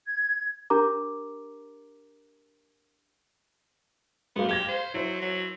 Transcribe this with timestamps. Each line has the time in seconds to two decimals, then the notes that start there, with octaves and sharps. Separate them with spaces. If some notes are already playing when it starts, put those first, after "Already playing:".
0.06 G#6
0.70 D4 G4 A#4 A#5 D6
4.36 G#2 F#3 A#3 B3
4.49 G4 F5 G#6 A#6
4.69 C5
4.94 F#3 E4 C5
5.22 F#3